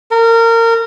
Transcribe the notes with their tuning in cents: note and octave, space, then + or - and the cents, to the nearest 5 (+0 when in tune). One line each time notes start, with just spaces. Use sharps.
A#4 -25